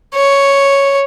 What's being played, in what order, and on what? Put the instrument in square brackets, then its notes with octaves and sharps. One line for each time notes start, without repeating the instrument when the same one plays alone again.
[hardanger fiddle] C#5